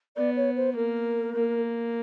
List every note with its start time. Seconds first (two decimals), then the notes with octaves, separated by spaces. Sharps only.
0.16 B3 D5
0.36 C#5
0.56 C5
0.76 A#3 A#4
1.36 A#3